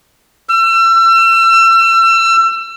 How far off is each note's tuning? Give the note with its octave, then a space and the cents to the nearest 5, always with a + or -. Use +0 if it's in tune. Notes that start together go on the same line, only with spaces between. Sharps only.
E6 +35